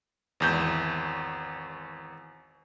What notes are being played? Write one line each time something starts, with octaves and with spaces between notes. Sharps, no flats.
G#1 E2 G6